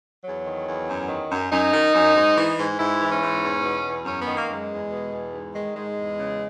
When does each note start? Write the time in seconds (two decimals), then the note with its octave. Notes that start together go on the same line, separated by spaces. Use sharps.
0.24 E2 F#3
0.46 D#3
0.66 E2
0.88 F#2
1.09 D#3
1.30 F#2
1.52 F#2 D#4
1.72 D#3
1.94 F#2
2.15 G#2
2.37 E3
2.57 G#2
2.78 G#2 E4
3.00 E3
3.11 C#4
3.22 G#2
3.42 E2
3.63 B2
3.85 E2
4.05 F#2 C#4
4.22 B3
4.27 D#3
4.37 A#3
4.49 F#2 G#3
4.70 E2
4.91 B2
5.12 E2
5.33 G#2
5.54 D#3 G#3
5.76 G#2 G#3
5.98 E2
6.19 C#3